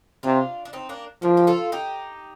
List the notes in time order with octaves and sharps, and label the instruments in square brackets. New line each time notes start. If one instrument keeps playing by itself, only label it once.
[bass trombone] C3 [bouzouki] D4 F4
[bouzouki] D4
C4 D#4
A#3 D4
[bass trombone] F3 [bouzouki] A#3 D4
[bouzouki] G4
F4 A4
D#4 G4